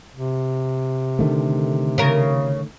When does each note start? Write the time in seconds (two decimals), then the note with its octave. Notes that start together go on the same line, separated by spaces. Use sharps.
0.13 C3
1.19 D3 D#3 A3
1.98 C#3 A#4